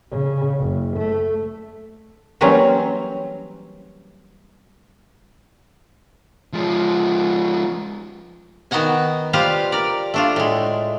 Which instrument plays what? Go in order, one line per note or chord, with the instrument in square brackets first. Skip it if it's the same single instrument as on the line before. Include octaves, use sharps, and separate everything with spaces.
[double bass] C#3
F#1
A3
[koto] E3 F#3 G3 A#3 C4 C#4
[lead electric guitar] F3 G#3
[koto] D#3 B3 D#4 F#4 F#5 G#5
G3 F4 G4 B4 C5 F5
A#4 D5
A3 D4 F4
A2 G#3